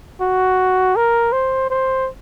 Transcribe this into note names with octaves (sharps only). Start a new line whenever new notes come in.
F#4
A#4
C5
C5